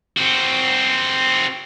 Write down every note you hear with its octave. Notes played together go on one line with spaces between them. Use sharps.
C4 F#4